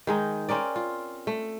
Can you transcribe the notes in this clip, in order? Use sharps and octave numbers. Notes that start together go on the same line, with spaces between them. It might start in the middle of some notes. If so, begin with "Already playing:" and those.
D#3 G#3 D#4
C4 C#4 A#4 D5
F4
A3